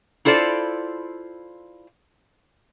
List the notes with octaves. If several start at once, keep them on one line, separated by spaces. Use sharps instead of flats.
E4 F4 A4 C5 D5